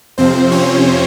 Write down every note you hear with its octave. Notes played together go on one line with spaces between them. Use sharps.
F2 C3 F3 C4 C5
C#4 C#5